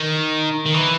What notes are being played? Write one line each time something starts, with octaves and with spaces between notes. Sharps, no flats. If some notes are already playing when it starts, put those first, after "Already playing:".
Already playing: D#3
D#3
E3